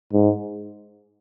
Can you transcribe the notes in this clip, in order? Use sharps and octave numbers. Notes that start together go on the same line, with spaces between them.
G#2